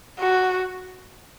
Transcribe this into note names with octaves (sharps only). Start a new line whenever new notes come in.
F#4